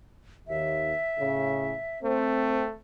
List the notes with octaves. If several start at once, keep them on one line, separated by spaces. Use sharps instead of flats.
D#2 E5
A2 C#3
A3 C4